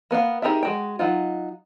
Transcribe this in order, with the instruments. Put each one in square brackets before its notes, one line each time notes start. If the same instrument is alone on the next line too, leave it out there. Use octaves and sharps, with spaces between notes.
[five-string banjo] A#3 B3 A4 F5
D#4 G4 G#4 A#4 E5
G#3 F#4 G5
F#3 D#4 F4